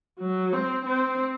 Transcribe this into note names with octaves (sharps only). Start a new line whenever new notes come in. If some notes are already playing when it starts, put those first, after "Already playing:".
F#3
C4
C4